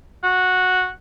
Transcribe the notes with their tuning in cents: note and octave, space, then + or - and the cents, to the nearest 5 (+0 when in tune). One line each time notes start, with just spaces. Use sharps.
F#4 -10